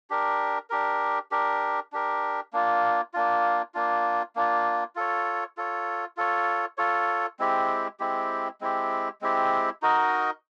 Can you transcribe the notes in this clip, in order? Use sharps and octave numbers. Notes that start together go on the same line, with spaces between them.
D4 G4 A#4
D4 G4 A#4
D4 G4 A#4
D4 G4 A#4
A#3 D4 F4
A#3 D4 F4
A#3 D4 F4
A#3 D4 F4
F4 A4 C#5
F4 A4 C#5
F4 A4 C#5
F4 A4 C#5
G#3 C4 E4 G4
G#3 C4 E4 G4
G#3 C4 E4 G4
G#3 C4 E4 G4
D#4 F#4 A#4 D#5